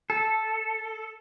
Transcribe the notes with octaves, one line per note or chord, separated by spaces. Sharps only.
A4